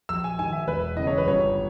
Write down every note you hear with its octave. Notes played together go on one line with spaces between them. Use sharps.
A#1 E6
G#5
G#2 D#3 G#5
E5
E1 B4
E2 C#3 E3 D#5
C#5
B4
G1 C#5